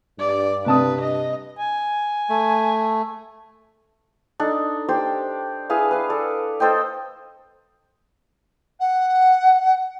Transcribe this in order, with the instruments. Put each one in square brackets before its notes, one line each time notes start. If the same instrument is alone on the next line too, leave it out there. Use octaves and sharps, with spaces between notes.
[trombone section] G2 [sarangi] D5
[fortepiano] C3 A5 D#6 [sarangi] B4
[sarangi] D#5
[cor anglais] G#5
[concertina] A3
[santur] D4 D#4 A4
G4 C5 D5 E6
E4 G#4 B4 F5
B4 F5
A4 D5
A4 C5 D#5 G5
[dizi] F#5